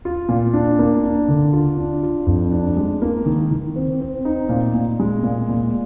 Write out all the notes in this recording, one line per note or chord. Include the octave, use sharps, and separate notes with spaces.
F4
A#2
D4
A#3
D4
D3
F4
D4
F4
F2
D4
G#3
A#3
D#3
D#3
C4
C4
D#4
A#2
A#2
G#3
A#2
A#2